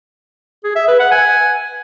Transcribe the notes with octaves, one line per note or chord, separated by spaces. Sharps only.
G#4
E5
B4
F#5
G#5